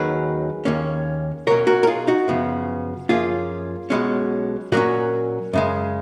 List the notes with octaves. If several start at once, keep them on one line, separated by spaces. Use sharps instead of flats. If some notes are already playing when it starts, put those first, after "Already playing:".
Already playing: D#2 D#3 F#3 C#4 G#4 B4
D#2 D#3 A#3 C#4
B1 B2 F#3 C#4 A#4 C#5
F#4 A#4
A#4
F4 G#4
D#4 F#4
F#2 C#3 F3 B3
F#2 F3 A#3 C#4 F4 G#4
B1 B2 G#3 C#4
A#2 F#3 A#3 C#4 F#4 A#4
F#2 C#3 G#3